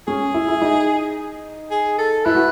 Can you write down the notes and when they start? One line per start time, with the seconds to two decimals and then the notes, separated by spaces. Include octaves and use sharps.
0.08 C#4 G#4
0.34 E4
0.48 E4
0.62 D#4
1.71 G#4
1.98 A4
2.25 E4 B4
2.35 F#4